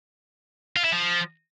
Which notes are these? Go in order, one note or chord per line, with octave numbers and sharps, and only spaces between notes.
F4
E4
F3